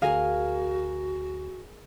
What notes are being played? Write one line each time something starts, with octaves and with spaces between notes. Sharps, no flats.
D2 F#4 G#4 A#4 F5 G#5